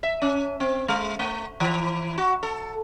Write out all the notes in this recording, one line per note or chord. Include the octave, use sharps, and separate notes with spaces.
E5
C#4
C4
G#3
A3
E3
F#4
A4